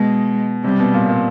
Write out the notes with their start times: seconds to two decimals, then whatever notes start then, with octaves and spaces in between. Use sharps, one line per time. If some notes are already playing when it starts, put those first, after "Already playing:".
Already playing: B2 G#3
0.64 C3 G3
0.79 B2
0.94 A#2
1.09 A#2